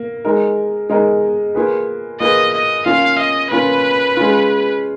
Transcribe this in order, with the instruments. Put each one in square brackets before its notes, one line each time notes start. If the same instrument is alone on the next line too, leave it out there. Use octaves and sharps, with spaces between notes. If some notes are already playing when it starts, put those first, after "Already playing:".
Already playing: [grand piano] A#3
G#3 D#4 A#4
G#3 D#4 A#4
A#3 F4 G#4 B4
[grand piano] A#3 F4 G#4 B4 [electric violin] D#5
[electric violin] D#5
[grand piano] A#3 C#4 F4 [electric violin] F5
[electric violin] D#5
[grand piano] A#3 C#4 F4 [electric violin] B4
[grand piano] G#3 C#4 F4